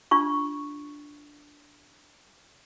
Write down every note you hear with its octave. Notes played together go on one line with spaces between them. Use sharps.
D4 F4 C#6